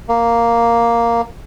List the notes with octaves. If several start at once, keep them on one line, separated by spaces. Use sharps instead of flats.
A#3